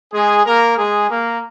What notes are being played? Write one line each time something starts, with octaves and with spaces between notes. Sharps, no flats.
G#3 G#4
A#3 A#4
G#3 G#4
A#3